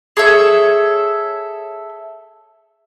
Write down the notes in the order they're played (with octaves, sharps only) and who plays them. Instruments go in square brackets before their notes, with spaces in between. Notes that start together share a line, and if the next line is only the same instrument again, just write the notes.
[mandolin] G#4 A4 C#5 E5